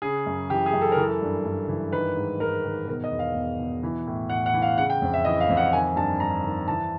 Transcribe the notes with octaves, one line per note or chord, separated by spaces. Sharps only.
C#3 G#4
F#2
E3 G4
G#4
F#2
A4
A#4
E3
A4
G2
G2
E3
D#3 B4
G#2
G#2 A#4
D#3
B2 A#4
D#5
E2
F5
E2
B2
E3
A2
A2 F#5
F#5
E3
F5
C#3 F#5
G5
F2
E5
E3 D#5
F5
F2
F#5
D#3 G#5
G2 A5
G2 A#5
D#3
E3 A5